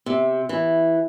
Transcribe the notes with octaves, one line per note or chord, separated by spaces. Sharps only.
C3
E3